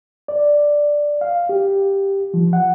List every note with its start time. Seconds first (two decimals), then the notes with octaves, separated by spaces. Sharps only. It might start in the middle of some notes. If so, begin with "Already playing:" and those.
0.28 D5
1.21 F5
1.49 G4
2.34 F3
2.53 F#5